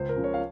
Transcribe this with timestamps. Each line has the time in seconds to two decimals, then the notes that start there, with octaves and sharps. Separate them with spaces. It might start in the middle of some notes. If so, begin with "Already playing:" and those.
Already playing: C#2 C5
0.09 A#4
0.16 C#3 F3
0.24 C#5
0.34 F5